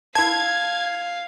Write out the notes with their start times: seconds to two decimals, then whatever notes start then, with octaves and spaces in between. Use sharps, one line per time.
0.15 E4 F5 A5 G#6